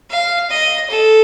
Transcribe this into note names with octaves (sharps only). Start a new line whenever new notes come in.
F5
D#5
A4